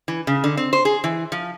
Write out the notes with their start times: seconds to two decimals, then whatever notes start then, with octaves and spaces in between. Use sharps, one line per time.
0.08 E3
0.27 C#3
0.44 D3
0.57 C4
0.73 C5
0.85 G#4
1.04 E3
1.32 F3